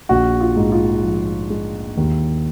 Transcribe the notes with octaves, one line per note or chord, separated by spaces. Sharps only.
A#1 F#4
F4
G#2
F4
F3
G#3
D#2